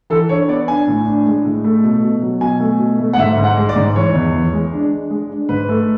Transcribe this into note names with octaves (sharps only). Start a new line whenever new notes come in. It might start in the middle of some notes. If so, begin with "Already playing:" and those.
E3 A4
D4 C#5
B3 D5
D4 G#5
A2
D4
G#3
A2
A3
B2
B2
F#3
B2 G#5
A3
B2
A3
F#5
G#2 E5
G#2
F#5
G#3
D5
G#2
E3 C#5
E2
E3
G#3
D4
D4
G#3
D4
G#2 B4
A3